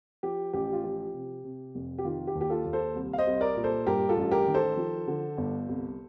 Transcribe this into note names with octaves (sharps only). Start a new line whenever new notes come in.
F3 G4
A1 G4
F4
F3 G4
C3
C3
F1
G4
D#3 F4
G4
D#2
G4
F4 A4
D#2
A4 C5
C2
F5
C5 D#5
C2
A#4 D5
A#2
A4 C5
G2 G4 A#4
F4 A4
A1
G4 A#4
D#3
A4 C5
F3
D3
G1
C2